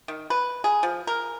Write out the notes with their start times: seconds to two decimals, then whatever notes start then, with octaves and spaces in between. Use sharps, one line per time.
0.08 D#3
0.30 B4
0.64 G#4
0.83 F3
1.07 A#4